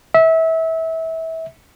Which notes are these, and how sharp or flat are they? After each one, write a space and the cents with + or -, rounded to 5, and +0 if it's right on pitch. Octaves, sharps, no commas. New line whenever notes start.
E5 -25